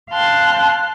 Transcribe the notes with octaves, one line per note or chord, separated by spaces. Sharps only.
F5 G5 A5 C6 F#6